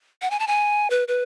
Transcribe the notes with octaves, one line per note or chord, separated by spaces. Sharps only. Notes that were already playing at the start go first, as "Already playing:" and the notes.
F#5
G#5
A5
G#5
B4
B4